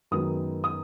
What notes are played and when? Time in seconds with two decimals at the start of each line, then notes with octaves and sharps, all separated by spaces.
0.11 F#2 D#3 G#3 B3 D#6
0.64 D#6